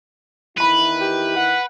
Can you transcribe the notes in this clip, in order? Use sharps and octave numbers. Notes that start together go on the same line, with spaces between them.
E2 D#3 E4 B4 B5 D#7
G4
F#5